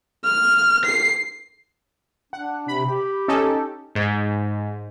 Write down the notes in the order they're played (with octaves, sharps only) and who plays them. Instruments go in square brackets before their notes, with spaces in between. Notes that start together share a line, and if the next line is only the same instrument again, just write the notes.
[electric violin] F6
C7
[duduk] D4 [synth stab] F#5
[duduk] C3 [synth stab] B5
[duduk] G4
[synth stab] C#4 D#4 A4
[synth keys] G#2